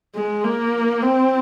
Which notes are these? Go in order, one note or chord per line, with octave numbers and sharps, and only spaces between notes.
G#3
A#3
C4